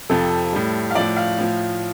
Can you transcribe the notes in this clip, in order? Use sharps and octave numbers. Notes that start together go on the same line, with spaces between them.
F2 C3 F3 A4
A2 G3
F5
A2 F3 D5
F5
A2 F3